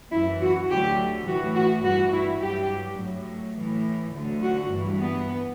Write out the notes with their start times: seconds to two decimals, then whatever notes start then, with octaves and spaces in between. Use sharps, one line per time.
0.11 F#2 E3 E4
0.41 F#4
0.69 D2 D3 F#3 G4
1.27 A2 E3 F#4
1.55 F#4
1.84 G2 E3 F#4
2.13 E4
2.41 G2 F#3 G4
2.98 A2 F#3
3.56 A2 E3
4.14 D2 D3 F#3
4.42 F#4
4.70 G2 E3
4.99 B3